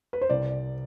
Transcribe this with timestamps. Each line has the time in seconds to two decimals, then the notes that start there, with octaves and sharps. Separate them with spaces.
0.13 B4
0.21 C5
0.29 C2 D5